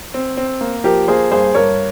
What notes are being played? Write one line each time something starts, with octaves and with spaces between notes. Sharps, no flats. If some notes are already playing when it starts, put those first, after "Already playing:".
C4
C4
A#3
F3 G4 A#4
A#3 G#4 C5
G2 G#4 C5
G2 A#4 C#5